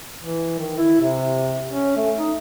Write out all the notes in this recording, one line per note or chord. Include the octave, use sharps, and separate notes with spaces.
E3
D#3
E4
C3
C#4
A3
D#4